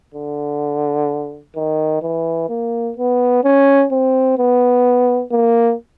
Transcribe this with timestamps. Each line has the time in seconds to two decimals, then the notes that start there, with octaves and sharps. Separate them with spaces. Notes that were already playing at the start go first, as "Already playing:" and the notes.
0.14 D3
1.56 D#3
2.02 E3
2.49 A#3
2.97 B3
3.44 C#4
3.91 C4
4.38 B3
5.32 A#3